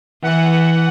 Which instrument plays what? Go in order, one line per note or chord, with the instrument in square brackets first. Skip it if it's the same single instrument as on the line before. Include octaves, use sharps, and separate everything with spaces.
[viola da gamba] E3 [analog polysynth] F#5